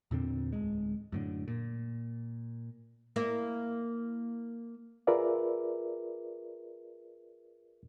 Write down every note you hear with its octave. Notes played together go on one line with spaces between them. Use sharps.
E2 A#2 D3 C4
D1 G#3
F#2 A2 D3
A#2
A#3 E4 A#4
F4 G#4 A#4 B4 D5 E5